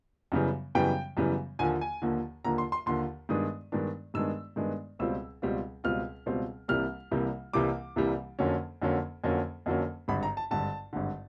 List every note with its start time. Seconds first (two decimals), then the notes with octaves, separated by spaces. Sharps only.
0.32 F#2 C#3 E3 G3 B3
0.75 F#2 C#3 E3 G3 B3 G5
1.17 F#2 C#3 E3 G3 B3
1.59 D#2 D3 F3 A#3 G#5
1.81 G#5
2.02 D#2 D3 F3 A#3
2.45 D#2 D3 F3 A#3 A#5
2.58 C6
2.72 C6
2.86 D#2 D3 F3 A#3 C6
3.29 G2 D#3 G#3 B3 D4 D#6
3.72 G2 D#3 G#3 B3 D4
4.14 G2 D#3 G#3 B3 D4 E6
4.56 G2 D#3 G#3 B3 D4
4.99 C#2 B2 G3 C4 F4 E6
5.42 C#2 B2 G3 C4 F4
5.84 C#2 B2 G3 C4 F4 F6
6.26 C#2 B2 G3 C4 F4
6.68 C2 C3 E3 G3 A#3 F6
7.11 C2 C3 E3 G3 A#3
7.53 C2 C3 E3 G3 A#3 D6
7.96 C2 C3 E3 G3 A#3
8.39 F2 D3 F#3 A#3 C#4
8.82 F2 D3 F#3 A#3 C#4
9.24 F2 D3 F#3 A#3 C#4
9.66 F2 D3 F#3 A#3 C#4
10.08 G#1 G2 D3 B5
10.23 A#5
10.37 A5
10.51 G#1 G2 D3 A5
10.93 G#1 G2 D3